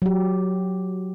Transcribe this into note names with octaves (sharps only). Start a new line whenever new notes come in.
F#3 G4